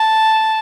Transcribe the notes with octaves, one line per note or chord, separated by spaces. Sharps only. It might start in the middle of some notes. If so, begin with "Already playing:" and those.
Already playing: A5